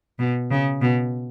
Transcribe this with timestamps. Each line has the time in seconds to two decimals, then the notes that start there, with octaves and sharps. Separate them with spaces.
0.19 B2
0.51 C#3
0.82 B2